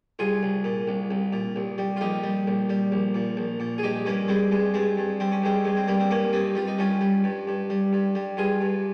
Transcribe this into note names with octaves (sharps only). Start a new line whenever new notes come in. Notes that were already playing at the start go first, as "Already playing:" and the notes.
C2 F4 G#4
C2
A#2
C2
C2
A#2
C2
G3
F4
A#1 D#4 G4
G3
A#1
G3
A#1
A#2
A#1
A#2
G#4
G2 D#4 G4
G2 A#3 C#4
G3 G#3 C4
G2 G#3
G2 G#3 C4
G2
G3 C4
C#4
G2 G#3 C4
G2 G#3
C4
G2 G3 A#3
C4
G2 A#3 C#4
G2 C4 D#4
G3 F4
D#4
G3 C#4 F4
G3
G2
G2
G3
G2
G3
G2 F4 G#4
G2